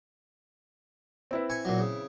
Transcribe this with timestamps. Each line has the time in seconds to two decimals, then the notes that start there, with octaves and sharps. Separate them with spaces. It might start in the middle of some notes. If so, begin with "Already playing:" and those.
1.31 C4 E4 B4
1.50 G#5 C#6
1.65 A#2 F#3
1.79 C#3